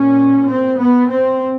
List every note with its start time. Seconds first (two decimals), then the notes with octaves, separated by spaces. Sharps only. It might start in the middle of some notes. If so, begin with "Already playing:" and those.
Already playing: A#2 C#4
0.48 C4
0.79 B3
1.10 C4